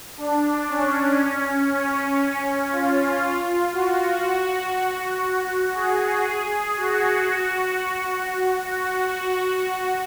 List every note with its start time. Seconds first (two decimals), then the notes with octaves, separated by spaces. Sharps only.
0.18 D4
0.69 C#4
1.69 C#4
2.71 F4
3.73 F#4
4.22 F#4
5.75 G#4
6.76 F#4
7.27 F#4
8.80 F#4